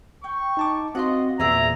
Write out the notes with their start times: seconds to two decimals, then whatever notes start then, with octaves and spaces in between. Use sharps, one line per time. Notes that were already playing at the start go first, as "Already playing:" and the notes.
0.24 G5 C#6
0.57 D#4 A5 D6
0.95 C4 F#4 D#5 F5 F#5 C6
1.40 E2 A#2 G#4 D5 E5 A#5